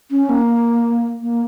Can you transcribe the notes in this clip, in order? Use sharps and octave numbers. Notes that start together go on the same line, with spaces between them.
C#4
A#3
A#3